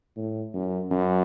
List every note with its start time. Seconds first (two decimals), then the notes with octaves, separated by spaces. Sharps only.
0.16 A2
0.54 F#2
0.91 F#2